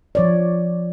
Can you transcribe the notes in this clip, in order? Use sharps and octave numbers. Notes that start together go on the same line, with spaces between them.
F3 C#5 D5